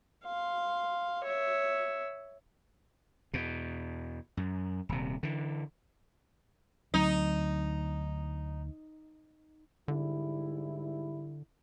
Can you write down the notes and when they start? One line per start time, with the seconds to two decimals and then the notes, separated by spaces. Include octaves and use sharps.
0.24 F5 C6
1.24 C#5 E5
3.34 E2 B2
4.37 F#2
4.89 D#1 C3
5.23 D3 E3
6.94 D2 F#3 C4 D#4
9.88 G#2 D3 G3 E4